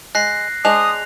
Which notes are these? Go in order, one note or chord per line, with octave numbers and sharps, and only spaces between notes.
G#3 F#6 A#6 C7
G#3 D4 C5 D#6 F#6 F7